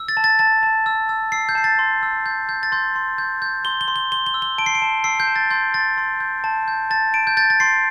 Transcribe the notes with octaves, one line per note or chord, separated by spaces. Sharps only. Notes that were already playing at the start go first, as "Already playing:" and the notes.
Already playing: E6
A6
A5
A6
A5 A6
A5
E6
E6
E6 C7
G6
A5 C7
A6
C6
E6
G6
G6
A6
C6 G6
C6
G6
G6
C6 G7
G7
C6
G7
C6 G7
G7
E6
G7
A5 D7
C7
D7
A5
E6 C7
G6
A5
A6
C6 G6
C6 A6
C6
G6
A5
G6
A5 A6
A5 D7
G6
G6 A6
A6
C6 C7